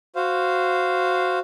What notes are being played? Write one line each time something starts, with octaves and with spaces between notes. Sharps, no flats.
F#4 C5 F5